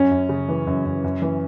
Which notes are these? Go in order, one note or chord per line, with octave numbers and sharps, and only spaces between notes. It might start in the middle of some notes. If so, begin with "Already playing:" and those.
Already playing: F#2 C#4
F#2
C#3
E3
F#2
F#2
F#2
E3